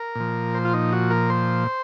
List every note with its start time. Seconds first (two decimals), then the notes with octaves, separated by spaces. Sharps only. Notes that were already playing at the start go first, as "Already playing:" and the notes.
Already playing: A#4
0.15 A#2 F3
0.55 C5
0.65 F4
0.73 D#4
0.92 F#4
1.10 A#4
1.30 C5